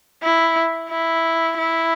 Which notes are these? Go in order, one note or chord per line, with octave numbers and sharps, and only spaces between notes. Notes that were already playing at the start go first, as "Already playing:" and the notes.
E4
E4
E4